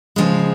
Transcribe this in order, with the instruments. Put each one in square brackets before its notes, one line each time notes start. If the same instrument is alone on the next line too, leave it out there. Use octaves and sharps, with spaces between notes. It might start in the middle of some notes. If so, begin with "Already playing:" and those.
[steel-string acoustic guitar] C#3 F3 G#3